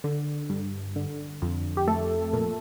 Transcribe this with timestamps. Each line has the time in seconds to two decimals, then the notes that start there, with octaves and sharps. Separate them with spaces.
0.04 D3
0.50 G2
0.96 D3
1.42 F2
1.77 G4
1.88 A3 A4
2.33 A#2